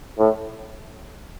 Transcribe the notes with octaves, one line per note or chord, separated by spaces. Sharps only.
A2